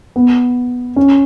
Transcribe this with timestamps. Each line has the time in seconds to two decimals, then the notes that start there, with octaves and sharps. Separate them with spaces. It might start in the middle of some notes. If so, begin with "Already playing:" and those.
0.16 B3
0.96 C#4